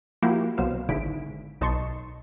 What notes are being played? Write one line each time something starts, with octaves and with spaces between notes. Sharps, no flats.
F3 A#3 E4 F#4 G4
C2 B2 F#3 C5 F5 E7
G#1 G#2 D3 E4 B6 D7
B1 D#4 D#5 A5 C6 C#6